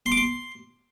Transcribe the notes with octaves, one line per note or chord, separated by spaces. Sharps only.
C6
D6
C6